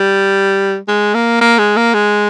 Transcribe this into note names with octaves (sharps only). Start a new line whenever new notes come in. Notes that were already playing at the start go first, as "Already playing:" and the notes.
Already playing: G3
G#3
A#3
A#3
G#3
A#3
G#3